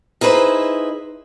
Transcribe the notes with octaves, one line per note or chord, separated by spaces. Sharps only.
D#4 E4 G#4 B4 C5